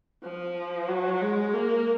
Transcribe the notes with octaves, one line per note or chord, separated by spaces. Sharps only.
F3
F#3
G#3
A#3